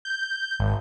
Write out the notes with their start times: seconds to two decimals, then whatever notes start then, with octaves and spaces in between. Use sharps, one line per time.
0.05 G6
0.60 G#1